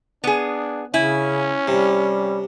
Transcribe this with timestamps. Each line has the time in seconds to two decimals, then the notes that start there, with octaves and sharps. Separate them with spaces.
0.24 B3 D4 G#4
0.94 C#3 C#4 E4 G#5
1.68 C3 G3